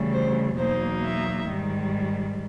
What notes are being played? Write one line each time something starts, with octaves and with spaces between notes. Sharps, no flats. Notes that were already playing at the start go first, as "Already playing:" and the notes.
Already playing: D2 C#3 E3 G3
C5
E2 B2 F#3 A#3 D#4 C5
E5
G#2 D#3 G3